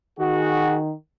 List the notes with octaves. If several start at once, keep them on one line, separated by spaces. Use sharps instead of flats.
D#3 F#4 G#4